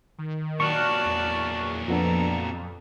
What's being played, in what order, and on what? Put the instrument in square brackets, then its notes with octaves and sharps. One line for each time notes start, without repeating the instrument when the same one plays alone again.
[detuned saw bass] D#3
[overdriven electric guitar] A#2 F#3 [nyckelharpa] D5 A5 [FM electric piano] C#6 F6 F#6
[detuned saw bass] E2
[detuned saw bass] F2 [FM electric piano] F3 B3 D4 [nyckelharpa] A4 A#5